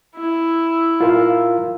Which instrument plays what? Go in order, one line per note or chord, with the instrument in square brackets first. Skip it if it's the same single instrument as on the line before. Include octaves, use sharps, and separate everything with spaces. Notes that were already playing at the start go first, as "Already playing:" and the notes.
[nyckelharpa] E4
[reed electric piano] F4 A#4 F5